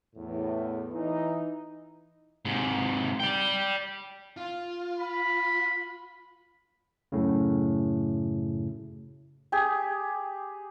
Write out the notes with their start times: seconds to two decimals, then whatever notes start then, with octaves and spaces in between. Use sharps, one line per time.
0.16 E2 A2
0.92 E3 D#4
2.45 G#2 C3
3.20 D5 G5
4.37 F4
4.99 B5
7.12 F#2 A2 C#3
9.52 G4 G#4